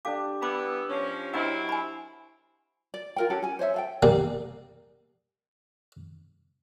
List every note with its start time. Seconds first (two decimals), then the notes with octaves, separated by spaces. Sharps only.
0.05 D4 G4 A4 F5 D6
0.42 E3 B3 B5 D6
0.89 F3 C#4 C#5
1.34 F#3 C4 D4 E4 F4 D#5 F5 F#5
1.69 F#5 G#5 B5
2.94 D5
3.16 F4 A#4 G5
3.30 C#4 F#4 G4 A4
3.42 C#4 G#5
3.59 C5 C#5 D#5 E5
3.74 A4 F5 G5
4.03 G3 A#3 G#4